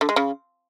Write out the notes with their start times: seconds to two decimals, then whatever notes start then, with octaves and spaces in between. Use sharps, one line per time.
0.01 D3
0.09 G#3
0.16 C#3